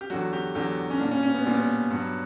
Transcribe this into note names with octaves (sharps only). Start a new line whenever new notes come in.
G4
E2 D3 F#3 F#4
G4
E2 D3 F#3 G4
C#4
A#2 G3 D4
C#4
C#4
B3
A#2 G3 C#4
B3
G2 F#3